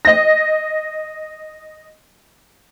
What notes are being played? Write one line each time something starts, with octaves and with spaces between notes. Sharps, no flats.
D#5 A#6